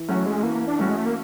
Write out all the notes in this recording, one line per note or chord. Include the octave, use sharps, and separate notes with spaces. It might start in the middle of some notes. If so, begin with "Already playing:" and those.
Already playing: E3
F#3 A3 C#4 F#4
G#3
E3 A#3
D4
G3 A3 C#4 F#4
G#3
A3
A#3